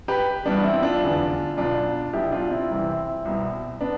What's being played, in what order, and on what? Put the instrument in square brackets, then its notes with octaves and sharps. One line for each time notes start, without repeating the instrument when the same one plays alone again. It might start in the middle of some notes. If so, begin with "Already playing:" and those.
[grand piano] G4 B4
G1 G2 E3 B3 D4
C4 E4
D4 F4
F1 E2 D3
B1 B2 D4 F4
B1 B2 E4 G4
D4 F4
C4 E4
C2 C3 E3
C2 B2
B3 D4